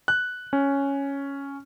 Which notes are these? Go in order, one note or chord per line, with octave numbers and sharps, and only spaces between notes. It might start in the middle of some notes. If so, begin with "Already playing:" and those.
F#6
C#4